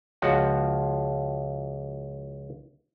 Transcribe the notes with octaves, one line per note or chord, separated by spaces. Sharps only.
C#2 F3 F#4 F#5